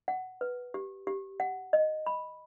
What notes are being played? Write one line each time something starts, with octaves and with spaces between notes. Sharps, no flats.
F#5
B4
G4
G4
F#5
D#5
B5